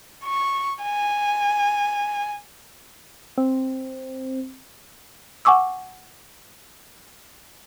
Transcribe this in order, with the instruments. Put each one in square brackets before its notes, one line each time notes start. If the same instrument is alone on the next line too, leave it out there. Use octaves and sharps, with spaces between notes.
[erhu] C#6
G#5
[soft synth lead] C4
[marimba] F#5 G#5 C#6 D6 E6